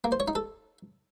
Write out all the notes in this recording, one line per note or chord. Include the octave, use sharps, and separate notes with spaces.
A#3
C5
C#5
D#4
A4